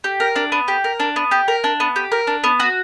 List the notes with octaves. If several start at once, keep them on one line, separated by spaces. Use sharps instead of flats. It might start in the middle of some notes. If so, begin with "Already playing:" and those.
G4
A#4
D4
B3
G4
A#4
D4
B3
G4
A#4
D4
B3
G4
A#4
D4
B3
F#4